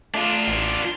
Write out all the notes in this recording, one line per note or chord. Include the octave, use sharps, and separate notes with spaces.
A3 D4 F4
A1